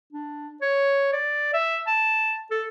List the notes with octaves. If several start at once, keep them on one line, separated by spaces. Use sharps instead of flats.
D4
C#5
D5
E5
A5
A4